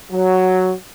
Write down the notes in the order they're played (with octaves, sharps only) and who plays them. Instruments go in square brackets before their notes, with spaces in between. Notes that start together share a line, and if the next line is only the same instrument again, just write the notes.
[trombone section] F#3